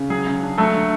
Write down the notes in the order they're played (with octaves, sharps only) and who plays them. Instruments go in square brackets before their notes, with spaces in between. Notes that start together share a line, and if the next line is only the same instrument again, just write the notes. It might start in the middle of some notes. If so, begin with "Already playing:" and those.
Already playing: [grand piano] C#3
F#3 G#4
C#3
D4
F#3 A3 A4
D3